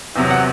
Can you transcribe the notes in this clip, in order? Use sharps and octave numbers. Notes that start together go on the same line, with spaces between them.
E2 C3 F#3
F#5